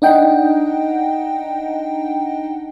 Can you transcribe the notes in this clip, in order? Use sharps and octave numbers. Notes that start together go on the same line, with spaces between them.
D4 D#4 D#5 F#5 G5